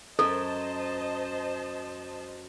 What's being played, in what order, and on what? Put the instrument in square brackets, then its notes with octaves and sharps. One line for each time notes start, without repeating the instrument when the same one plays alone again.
[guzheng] F#2 [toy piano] A4 [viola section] C5 D#5 A5